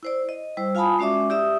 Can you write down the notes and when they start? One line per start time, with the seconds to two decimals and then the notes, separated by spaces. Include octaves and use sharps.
0.03 E4 C5 D5
0.29 D#5
0.57 G3 E4 C5
0.75 F4 F5 G#5 A5 B5 D#6
0.99 G#3 C#4 F#4 D5 E5 D6
1.29 E4 G4 D5 E5 D#6